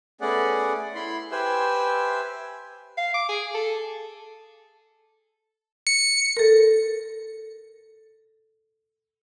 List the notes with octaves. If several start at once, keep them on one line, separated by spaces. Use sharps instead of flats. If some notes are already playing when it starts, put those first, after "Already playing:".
A3 B3 C#4 G#4 D5 F#5
E4 B5 C6
G4 B4 C5 E5 G#5 E6
F5
D6
G#4
A4
C#7
A4 A#4